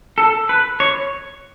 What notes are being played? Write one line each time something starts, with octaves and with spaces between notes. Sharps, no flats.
A4
B4
C#5